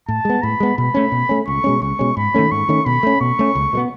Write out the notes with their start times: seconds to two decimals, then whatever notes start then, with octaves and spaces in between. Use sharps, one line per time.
0.08 A2 A5
0.25 G#3 B3
0.43 A2 B5
0.60 G#3 B3
0.77 B2 B5
0.94 A3 C#4
1.12 B2
1.29 A3 C#4
1.47 C#2 C#6
1.64 B2 G#3 C#4
1.82 C#2 C#6
1.99 B2 G#3 C#4
2.17 G#2 B5
2.34 D#3 A3 C#4
2.52 G#2 C#6
2.69 D#3 A3 C#4
2.86 B2 B5
3.03 A3 C#4
3.21 B2 C#6
3.39 A3 C#4
3.55 C#2
3.73 B2 G#3 B3